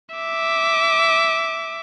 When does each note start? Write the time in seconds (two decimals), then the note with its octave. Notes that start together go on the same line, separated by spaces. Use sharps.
0.15 E5 D6